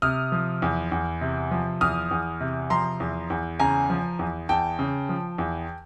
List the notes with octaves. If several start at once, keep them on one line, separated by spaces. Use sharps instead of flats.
C3 D#6 F6
F3
E2
E2
C3
F3
E2 D#6 F6
E2
C3
F3 A#5 C6
E2
E2
C#3 G#5 A#5
F3
E2
E2 G5 A5
C#3
F3
E2